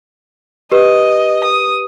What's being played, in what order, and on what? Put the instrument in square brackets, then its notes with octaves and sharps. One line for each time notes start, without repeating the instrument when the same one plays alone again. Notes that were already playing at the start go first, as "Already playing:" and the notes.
[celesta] G4 B4 [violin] D#5
[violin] D#6